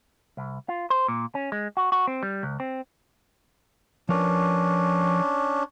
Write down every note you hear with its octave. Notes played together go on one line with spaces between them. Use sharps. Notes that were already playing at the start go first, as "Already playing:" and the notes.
C2
F4
C5
A#2
C#4
G#3
F#4
F#4
C4
G3
C#2
C4
F3 C#4 D4 A#4 B4